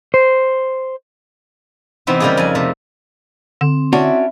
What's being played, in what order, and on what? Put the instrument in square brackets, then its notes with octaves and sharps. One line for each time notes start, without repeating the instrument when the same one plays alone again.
[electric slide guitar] C5
[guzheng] C3 E3 B3 C4 D#4
C#3 G3 A#3 F4 G4 G#4
F2 G#5
C3 A3
[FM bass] D3 [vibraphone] C4
[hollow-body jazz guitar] C#4 D4 F#4 [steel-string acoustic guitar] E4